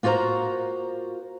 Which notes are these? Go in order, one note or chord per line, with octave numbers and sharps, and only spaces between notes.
A#3 F4 F#4 C5 A#5